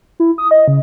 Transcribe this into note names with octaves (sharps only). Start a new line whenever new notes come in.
E4
D#6
D#5
C#3